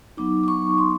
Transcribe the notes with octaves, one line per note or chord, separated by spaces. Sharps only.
F#3 B3 D#4 D6
D6
C#6
C6